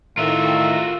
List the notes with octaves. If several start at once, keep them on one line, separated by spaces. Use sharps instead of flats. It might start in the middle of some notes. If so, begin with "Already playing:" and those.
A2 D#3 F4 F#4 E5 A#5